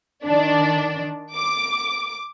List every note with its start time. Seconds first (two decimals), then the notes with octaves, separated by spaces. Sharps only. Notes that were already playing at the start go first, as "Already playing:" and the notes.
0.25 D#3 D4 D5
1.35 D6